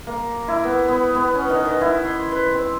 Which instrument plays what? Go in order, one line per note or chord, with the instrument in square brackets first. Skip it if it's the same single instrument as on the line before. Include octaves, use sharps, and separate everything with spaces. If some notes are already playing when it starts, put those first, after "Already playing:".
[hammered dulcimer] A#3
E4
B3
B3
B3
C#4
D#3
D#3
E4
C6
B4
C4